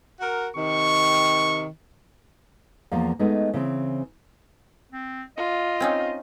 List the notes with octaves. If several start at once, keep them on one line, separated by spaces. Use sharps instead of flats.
F#4 A#4
C3 D#3 C#6
E2 F3 A#3
G#3 A3 B3 D#4
C#3 E3 C4
C4
F4 D#5
C4 C#4 D#4